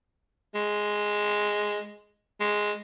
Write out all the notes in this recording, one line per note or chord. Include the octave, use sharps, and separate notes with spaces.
G#3
G#3